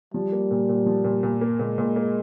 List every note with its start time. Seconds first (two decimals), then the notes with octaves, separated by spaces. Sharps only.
0.14 F3 G3
0.32 A#3
0.51 A#2
0.69 A#2
0.86 F3
1.04 A#2
1.23 A#2
1.41 A#3
1.59 A#2 G#3
1.78 A#2
1.96 A#3